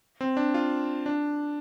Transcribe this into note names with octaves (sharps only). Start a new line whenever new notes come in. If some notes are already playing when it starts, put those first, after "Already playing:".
C4
D4
F4
D4